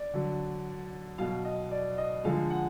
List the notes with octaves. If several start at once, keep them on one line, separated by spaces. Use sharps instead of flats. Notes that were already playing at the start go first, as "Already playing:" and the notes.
Already playing: D5
D3 F#3
B2 F#3 F5
D#5
D5
D#5
D3 F3 G#3 F5
F#5